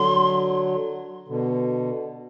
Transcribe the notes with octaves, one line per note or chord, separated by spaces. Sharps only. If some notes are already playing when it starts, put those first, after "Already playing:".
Already playing: D3 F#3 C6
B2 D3